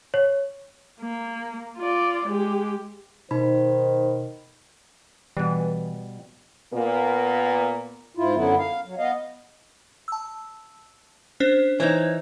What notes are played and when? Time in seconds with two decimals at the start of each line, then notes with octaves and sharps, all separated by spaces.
0.14 C#5
1.00 A#3
1.78 F4 D5
2.28 G#3 G4
3.31 B2 D#3 D#4 C5 B5
5.37 B2 E3 G3
6.74 A#2 A#3 B3
8.17 G#2 E4 F4
8.35 F#2 D3 F#3 B3 E4
8.59 F5
8.85 F#3
8.98 B3 D#5 F5
10.08 A5 E6
11.40 C#4 D4 C5
11.80 E3 D#4 C5 C#5 G#6